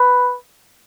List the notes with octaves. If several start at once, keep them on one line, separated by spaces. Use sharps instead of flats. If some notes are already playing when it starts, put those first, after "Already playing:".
Already playing: B4